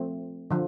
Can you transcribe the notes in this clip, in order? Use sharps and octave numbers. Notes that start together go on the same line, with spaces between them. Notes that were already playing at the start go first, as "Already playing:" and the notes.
Already playing: F3 A3 C4
D3 F3